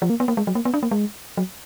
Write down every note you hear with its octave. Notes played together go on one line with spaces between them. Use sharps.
F3
A#3
B3
A#3
G#3
F#3
A#3
B3
D4
A#3
G#3
F#3